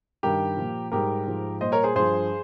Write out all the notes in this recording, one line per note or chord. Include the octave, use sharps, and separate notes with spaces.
G2 D#3 G3 G4 A#4
A#2 F3
G#2 G3 G4 A#4
G#2 F3
A#2 G3 C5 D#5
A#4 C#5
G#4 C5
G2 F3 G#4 C5